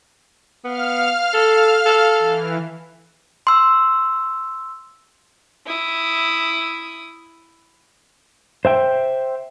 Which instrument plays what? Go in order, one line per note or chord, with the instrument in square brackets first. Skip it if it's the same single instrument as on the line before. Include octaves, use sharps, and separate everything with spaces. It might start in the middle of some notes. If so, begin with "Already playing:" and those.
[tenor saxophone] B3 [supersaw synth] F5 F6
[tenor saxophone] A4
A4
[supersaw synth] E3
[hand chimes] C6 E6
[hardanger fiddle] E4 D#6
[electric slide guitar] C5 E5 G5